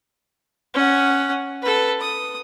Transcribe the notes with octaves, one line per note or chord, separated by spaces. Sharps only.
C#4 F#5
A4 B4
D#6